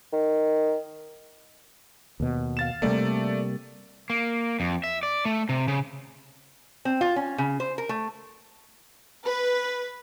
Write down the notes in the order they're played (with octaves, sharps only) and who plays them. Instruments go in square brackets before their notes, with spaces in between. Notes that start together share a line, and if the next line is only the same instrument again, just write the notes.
[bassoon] D#3
[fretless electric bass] D#2 B2
[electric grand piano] F5 A6 E7
[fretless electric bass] C3 G3 A#3 [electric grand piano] A3 D5
[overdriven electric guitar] A#3
F2
E5
D5
A3
C3
C#3
[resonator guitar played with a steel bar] C4
F4
C#4
C#3
C5
A#4
A3
[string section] B4